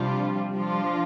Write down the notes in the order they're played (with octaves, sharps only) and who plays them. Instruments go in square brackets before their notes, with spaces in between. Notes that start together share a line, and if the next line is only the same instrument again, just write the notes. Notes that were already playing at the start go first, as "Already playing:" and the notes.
Already playing: [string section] C3 F3 D4 F4 [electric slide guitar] G3
[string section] F3 D4 F4